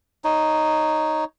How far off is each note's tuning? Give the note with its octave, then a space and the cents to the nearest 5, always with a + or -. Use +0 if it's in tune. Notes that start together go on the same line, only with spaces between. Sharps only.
D#4 +0 C#5 +0